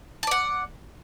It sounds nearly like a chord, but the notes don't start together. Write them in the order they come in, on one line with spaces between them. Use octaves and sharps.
A5 D5 F#5